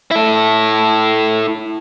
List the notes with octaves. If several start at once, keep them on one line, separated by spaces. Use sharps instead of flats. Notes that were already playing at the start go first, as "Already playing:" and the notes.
E4 A4